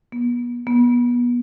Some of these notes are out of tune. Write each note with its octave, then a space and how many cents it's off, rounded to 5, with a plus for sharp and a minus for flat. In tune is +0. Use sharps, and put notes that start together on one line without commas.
B3 -35
B3 -30